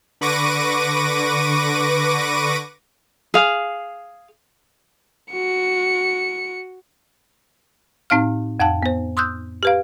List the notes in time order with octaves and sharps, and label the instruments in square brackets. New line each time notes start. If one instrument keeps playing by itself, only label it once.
[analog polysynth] D3 B4 C#6 D6 A#6 D#7
[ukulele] G#4 F5
[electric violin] F#4 C#7
[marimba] A2 C4 D#4 F5 F6
F2 F5 G5 A5
B3 C5
C6 D#6 E6 F#6 G6
G4 B4 F5